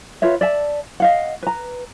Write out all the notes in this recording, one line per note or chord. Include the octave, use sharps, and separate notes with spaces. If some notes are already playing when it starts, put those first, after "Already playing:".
F4 B4 C#5 E5
D5 E5 A5
D#5 F5 F#5
B4 A#5